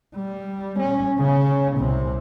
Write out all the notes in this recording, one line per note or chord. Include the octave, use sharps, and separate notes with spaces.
G3
C#4
C#3 C#4
C2 C3